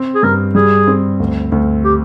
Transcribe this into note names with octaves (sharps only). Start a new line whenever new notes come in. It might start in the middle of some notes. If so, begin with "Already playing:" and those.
Already playing: C4
G#4
G2 A#4
G3 G#4
C4
D2
D2
G4